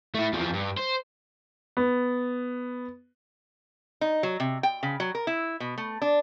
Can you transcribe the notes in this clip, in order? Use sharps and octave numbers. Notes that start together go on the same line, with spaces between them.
A3 E4
E2 F3
G2
C5
B3
D#4
F#3
C3
G5
C#3
F#3
A#4
E4
B2
A3
D4